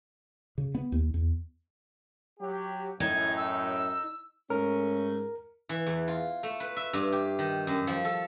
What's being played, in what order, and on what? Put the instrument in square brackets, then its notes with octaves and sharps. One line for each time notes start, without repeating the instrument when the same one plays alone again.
[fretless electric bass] C#3
B3
D#2
E2
[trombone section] F#3 G4
[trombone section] F#2 A2 [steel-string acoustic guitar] D#4 [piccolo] G#6
[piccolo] E6
[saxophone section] G#2 A3 C#4 [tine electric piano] A#4
[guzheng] E3
E2
F4
A3
B4
E5
G2
G4
D#3
F#2
F3
A4